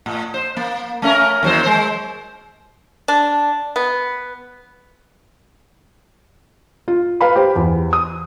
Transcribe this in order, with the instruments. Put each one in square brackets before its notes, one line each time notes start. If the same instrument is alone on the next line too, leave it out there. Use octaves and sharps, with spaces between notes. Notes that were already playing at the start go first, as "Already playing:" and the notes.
[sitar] A2
C5
A#3
A3 C#4 A#4
D#2 F#3 C5
G#3 C5
[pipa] D4
B3
[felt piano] F4
B4 F5 B5
G4 C5
E2
D#6